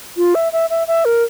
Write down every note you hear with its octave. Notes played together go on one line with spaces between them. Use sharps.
F4
E5
E5
E5
E5
A#4